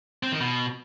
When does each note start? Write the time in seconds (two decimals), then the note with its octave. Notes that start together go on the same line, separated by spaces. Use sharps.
0.23 C4
0.32 D#3
0.41 B2